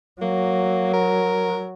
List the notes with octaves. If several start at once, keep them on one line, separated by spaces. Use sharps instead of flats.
F#3 A#3
A#4